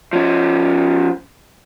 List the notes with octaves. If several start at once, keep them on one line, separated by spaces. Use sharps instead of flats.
F3 C#4